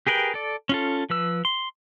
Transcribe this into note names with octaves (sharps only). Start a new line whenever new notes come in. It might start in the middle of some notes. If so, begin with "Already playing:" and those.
G4 G#4 A#4 B4 G5
A4 D5
C#4 F4 A4
F3 B4 E6
C6